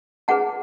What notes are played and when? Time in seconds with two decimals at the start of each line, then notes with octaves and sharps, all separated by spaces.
0.28 C#4 G#4 B4 F#5 A5